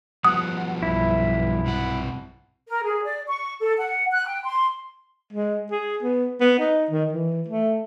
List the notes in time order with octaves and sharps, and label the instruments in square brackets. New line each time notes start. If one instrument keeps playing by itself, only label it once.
[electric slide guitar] F3 G3 B3 [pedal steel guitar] F#5 [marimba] D#6
[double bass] B1 G2 [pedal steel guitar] E4
[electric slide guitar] C3 F#5
[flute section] A#4
G#4
D5
C#6
A4
F#5
F#6
G5
C6
[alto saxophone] G#3
G#4
B3
B3
D#4
D#3
E3
A3